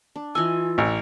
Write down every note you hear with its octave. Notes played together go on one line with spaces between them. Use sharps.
D4
E3 F4 D#5 G#5 E6
A1